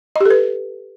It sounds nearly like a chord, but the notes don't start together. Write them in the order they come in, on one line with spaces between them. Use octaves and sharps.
D#5 G4 A4 B4